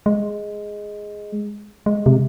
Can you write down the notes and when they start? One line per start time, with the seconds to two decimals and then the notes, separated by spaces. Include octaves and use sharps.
0.06 G#3
1.86 G#3
2.06 C3